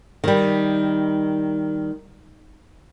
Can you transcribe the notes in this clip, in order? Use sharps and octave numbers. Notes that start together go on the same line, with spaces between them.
D#3 G3